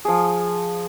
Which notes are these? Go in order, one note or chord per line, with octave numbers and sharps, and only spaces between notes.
F3 G#4